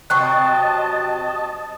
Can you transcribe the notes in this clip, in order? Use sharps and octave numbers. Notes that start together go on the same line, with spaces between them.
C3 F#3 C4 D#5 A5 C#6 F#6